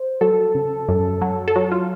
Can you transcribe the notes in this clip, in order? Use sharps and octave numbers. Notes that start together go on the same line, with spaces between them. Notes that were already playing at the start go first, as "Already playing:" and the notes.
Already playing: C5
F#3 A4
C#3
F#2
F#3
A4
F#3 F#4
F4